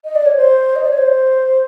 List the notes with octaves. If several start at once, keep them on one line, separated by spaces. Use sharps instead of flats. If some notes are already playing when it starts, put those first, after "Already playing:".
D#5
D5
C#5
C5
D#5
D5
C#5
C5